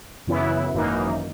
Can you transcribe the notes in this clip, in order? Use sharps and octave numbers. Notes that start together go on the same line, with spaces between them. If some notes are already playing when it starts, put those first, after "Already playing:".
F#2 C#3 E3 B3 E4
G#1 F#2 E3 A#3 D#4